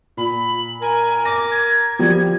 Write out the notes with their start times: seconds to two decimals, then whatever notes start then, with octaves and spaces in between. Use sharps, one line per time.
0.17 A#2 B5
0.82 A#4 G#5
1.25 D6 A#6
1.51 G#6
1.99 F3 G3 G#6